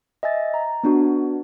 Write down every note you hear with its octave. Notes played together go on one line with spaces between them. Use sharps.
D#5 E5 G#5 A6
A#5
B3 D4 F#4